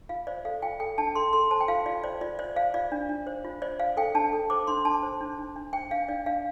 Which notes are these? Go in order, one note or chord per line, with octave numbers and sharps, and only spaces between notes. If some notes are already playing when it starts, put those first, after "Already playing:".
F4 F5
C5 D5
A4 F5
F4 G5
A4 G5
D4 A5
A4 C6
A4 C6
C5 A5
G5
F4 F5
F4 D5
C5 D5
F4 D5
C5 D5
C5 F5
F4 D5
D4
D4
C5
F4
C5 D5
C5 F5
A4 G5
D4 A5
A4
C5 D6
D4 C6
D4 A5
C5
D4
D4
D4
C5 G5
D4 F5
D4 D5
D4 F5